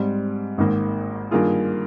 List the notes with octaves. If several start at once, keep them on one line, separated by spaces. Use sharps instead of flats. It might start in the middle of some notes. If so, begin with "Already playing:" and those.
Already playing: G#2 G3 C4
G#1 G#2 D#3 A#3
G2 D#3 A#3 F4 G#4